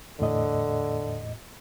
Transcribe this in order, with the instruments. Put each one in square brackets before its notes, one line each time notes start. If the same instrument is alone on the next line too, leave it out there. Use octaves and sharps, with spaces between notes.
[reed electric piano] E2 A2 D#5 [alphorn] D3